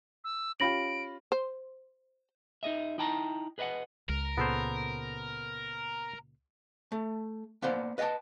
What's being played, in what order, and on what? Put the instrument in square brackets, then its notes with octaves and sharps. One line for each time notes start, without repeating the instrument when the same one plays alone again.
[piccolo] E6
[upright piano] C#4 F4 G4 [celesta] B5 A#6 F#7 [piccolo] D7
[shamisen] C5
[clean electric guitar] D#4 G#4 D#5 E5
D#4 E4 G5 A5 A#5
G#4 B4 D#5 E5 F#5
[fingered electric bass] C#2 [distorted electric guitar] A#4
[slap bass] A#2 C#3 [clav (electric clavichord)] B3 A4 C5
[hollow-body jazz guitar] A3
A#3 B3 C5 D5
B4 D#5 E5 G5 A5